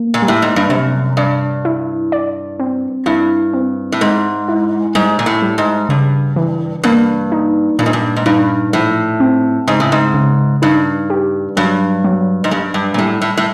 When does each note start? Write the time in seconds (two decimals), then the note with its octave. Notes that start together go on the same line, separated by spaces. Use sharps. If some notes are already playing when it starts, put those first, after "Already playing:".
Already playing: A#3
0.14 A#2
0.22 G3
0.28 A2
0.42 G#2
0.56 G2
0.69 F#2 C3
1.17 G2 D5
1.65 E4
2.12 D5
2.59 C4
3.06 G2 E4
3.53 C4
3.92 A2
4.01 G#2 G#3
4.48 E4
4.95 G#2 G3
5.19 A#2
5.26 A2
5.42 G3
5.58 G#2
5.89 G2 C#3
6.36 E3
6.84 G2 A#3
7.32 D#4
7.79 G2 A#2
7.86 G#2
7.93 G2
8.16 G#2
8.26 G2 D#4
8.73 A2 F3
9.20 C4
9.68 G#2 C#3
9.80 A2
9.92 G#2
10.14 C#3
10.62 G2 D#4
11.10 G4
11.57 G2 F#3
12.04 F#3
12.44 G#2
12.51 G2 G3
12.74 G2
12.94 A#2
12.98 A2 G3
13.22 A2
13.37 A2